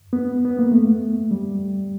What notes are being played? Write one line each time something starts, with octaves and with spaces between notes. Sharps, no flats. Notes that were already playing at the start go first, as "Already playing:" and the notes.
B3
B3
A#3
A3
G3